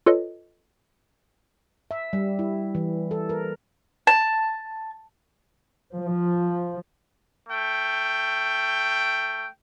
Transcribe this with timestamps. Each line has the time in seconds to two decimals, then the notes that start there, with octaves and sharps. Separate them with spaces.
0.06 F4 A4 B4 C#5 D#5
1.91 E5
2.13 G3
2.39 E4
2.75 E3
3.11 A4
3.29 A#4
4.07 A5
5.94 F3
7.49 A3 G5